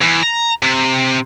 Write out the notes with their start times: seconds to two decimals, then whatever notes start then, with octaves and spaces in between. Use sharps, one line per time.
0.02 E2
0.23 A#5
0.63 C3